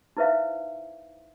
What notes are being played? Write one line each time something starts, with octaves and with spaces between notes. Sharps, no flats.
D#4 E4 B4 C5 E5 F5